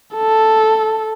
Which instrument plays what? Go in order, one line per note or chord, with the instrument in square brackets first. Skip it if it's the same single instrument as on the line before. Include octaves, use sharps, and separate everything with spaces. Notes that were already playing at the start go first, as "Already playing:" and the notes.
[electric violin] A4